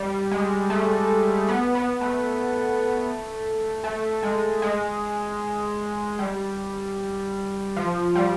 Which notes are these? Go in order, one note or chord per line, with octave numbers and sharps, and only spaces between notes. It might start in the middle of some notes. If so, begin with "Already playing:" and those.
Already playing: G3
G#3
A3
B3
B3
A3
A3
G#3
G#3
G3
F3
G3